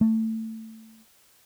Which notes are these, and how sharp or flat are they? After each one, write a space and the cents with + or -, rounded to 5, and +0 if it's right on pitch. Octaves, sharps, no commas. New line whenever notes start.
A3 +20